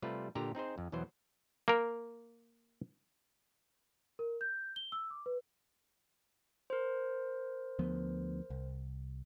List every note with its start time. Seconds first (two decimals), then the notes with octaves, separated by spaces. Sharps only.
0.02 C3 G3 A3 F4 B4
0.35 A#2 D3 G4 A#5
0.55 C4 D#4 G#4 C5
0.78 F2
0.92 E2 B2 E3 F#3 C5
1.68 A#3 A#4
4.19 A#4
4.41 G6
4.76 G7
4.92 E6
5.10 D6
5.26 B4
6.70 A#4 C5
7.79 D2 F3 B3
8.50 C2